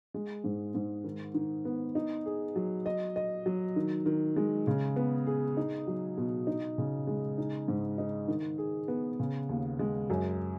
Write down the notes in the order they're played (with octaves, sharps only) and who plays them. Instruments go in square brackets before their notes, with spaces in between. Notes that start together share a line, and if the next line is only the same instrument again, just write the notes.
[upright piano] G#3
G#2
G#2
D#3
D#3
B3
D#4
G#4
F#3
D#5
D#5
F#3
D#3
D#3
G#3
C#3
B3
G#4
D#4
F#3
B2
D#4
C#3
G#3
D#4
G#2
D#4
D#3
G#4
B3
C#3
D#2
G#3
F#2